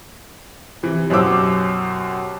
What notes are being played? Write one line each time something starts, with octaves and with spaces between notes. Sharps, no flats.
C3 E3
F#2 B2 G4 C5 D6 E6